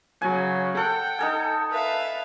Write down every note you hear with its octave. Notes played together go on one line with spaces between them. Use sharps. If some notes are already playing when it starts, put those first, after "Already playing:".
C#3 F#3 G#5
A4 F#5 G5
D#4 A4 G#5
B4 E5 F5